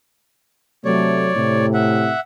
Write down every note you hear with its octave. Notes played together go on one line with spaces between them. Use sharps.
C3 F#3 A3 C#5 D5
A2 C3
E5 F#5